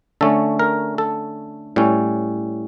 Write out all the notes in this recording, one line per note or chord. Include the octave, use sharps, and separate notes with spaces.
D3 A3 C#4 A4
A#4
A4
A2 G3 C#4